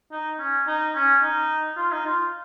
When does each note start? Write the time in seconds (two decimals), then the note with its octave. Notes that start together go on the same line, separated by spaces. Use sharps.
0.12 D#4
0.40 C#4
0.67 D#4
0.95 C#4
1.23 D#4
1.77 F4
1.92 D#4
2.06 F4